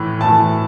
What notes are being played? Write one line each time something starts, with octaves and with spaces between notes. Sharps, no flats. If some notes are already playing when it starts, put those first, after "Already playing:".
Already playing: A2 E3
A2 E3 A5